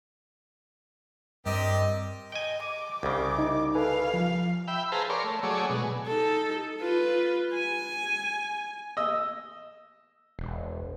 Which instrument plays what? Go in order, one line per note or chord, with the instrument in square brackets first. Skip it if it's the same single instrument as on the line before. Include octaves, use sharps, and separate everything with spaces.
[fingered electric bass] G2 [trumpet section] C4 A#4 D#5 [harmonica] G4 D5
[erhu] D#5 [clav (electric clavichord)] G5 G#5
[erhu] D6
[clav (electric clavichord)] C2 C#3
[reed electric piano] D#4
[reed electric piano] A4 B4 G#5 [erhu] F5
[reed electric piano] F3
[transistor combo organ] E5 G5 B5
G#4 B4 C5 F5 A5 A#5
A#4 C#5 D5 C6
A3
F#3 A3 G#4 C#5 D5
B2 G#3
[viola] D#4 A4
F4 B4
G#5
[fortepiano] D#5 E6
[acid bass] E1